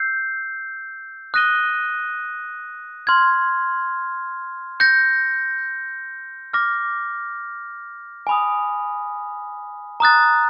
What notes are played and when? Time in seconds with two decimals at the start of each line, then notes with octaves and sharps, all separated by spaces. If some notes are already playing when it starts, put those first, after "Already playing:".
Already playing: E6 G6 C7
1.34 D#6 F#6 A#6 D#7 G7
3.07 C6 F6 G#6
4.80 G6 A#6 C#7
6.53 D6 F6 A#6
8.27 G#5 B5 D#6
10.00 A#5 D#6 F#6 A6